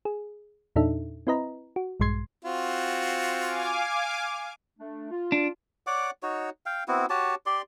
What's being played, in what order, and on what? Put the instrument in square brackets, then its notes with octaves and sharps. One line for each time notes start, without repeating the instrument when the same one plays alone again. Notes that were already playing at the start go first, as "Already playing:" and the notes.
[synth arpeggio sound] G#4
E2 A#2 D4 D#4 A4 E5
C4 E4 B4 D#5 A#5
F#4
A#1 G2 G#3 C6 G#6 C7
[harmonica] C4 F4 F#4
[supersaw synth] F5 G#5 D6
[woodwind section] A3 D4
F4
[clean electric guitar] D4
[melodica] C#5 D5 F#5 D6
D#4 F#4 C#5
F5 G5
B3 C4 E4 F#4
F#4 G4 C#5 A5
G4 D5 C6